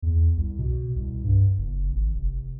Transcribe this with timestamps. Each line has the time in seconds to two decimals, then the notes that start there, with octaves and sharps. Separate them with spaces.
0.02 E2
0.37 C2
0.59 B2
0.96 C2
1.24 G2
1.58 F#1
1.92 G#1
2.15 F1